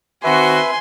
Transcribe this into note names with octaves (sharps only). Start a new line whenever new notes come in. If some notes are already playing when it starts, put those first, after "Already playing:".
D#3 C4 F#4 B4 E5 G#5 C6